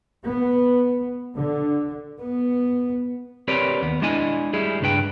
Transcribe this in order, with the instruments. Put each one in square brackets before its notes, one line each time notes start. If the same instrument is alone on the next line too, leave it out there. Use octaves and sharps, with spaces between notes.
[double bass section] B3
D3
[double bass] B3
[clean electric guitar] C4 G4 A#4 B4 C#5 D5
D#2 B3
G#3 D4 E4 D#5 G#5
G3 E4 G#4
C#2 G2 D4 B4 G5